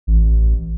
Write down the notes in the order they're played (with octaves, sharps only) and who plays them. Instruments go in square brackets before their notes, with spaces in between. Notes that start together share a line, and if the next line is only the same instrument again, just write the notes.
[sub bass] A1